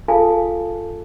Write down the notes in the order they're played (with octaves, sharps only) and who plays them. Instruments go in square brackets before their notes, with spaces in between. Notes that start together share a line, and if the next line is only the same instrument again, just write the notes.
[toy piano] F4 G#4 A4 F5 G#5 A5